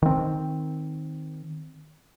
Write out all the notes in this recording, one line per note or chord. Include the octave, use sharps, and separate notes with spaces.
D#3 C4